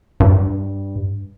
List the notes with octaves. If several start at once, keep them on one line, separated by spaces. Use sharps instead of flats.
G2